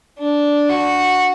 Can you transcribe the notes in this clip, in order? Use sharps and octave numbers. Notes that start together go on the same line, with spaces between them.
D4
F#4